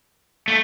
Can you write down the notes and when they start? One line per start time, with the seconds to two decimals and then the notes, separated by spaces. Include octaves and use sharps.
0.48 A3